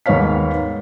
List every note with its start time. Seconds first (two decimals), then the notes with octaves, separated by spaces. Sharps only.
0.06 D#2 G#2 B3 C#5 F5 B6